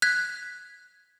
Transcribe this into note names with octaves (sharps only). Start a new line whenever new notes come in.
F#6 G#6 B6